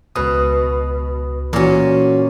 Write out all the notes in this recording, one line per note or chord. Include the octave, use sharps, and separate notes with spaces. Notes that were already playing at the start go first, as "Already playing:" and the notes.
C#2 B2 B4 D#6
A#2 E3 C#4 F#4